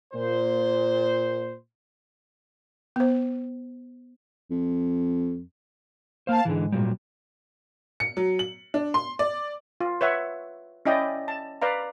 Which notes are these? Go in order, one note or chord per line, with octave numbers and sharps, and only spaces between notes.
A#2 C5
B3 C5
F2
A#3 C5 F5 A5
G#2 D3 E3
A#2 F#3 G3
C#7
F#3
F#7
D4
C6
D5
F4
B4 C#5 E5 F#5
C#4 E4 D5 D#5 G5
A5
B4 D5 F5 A#5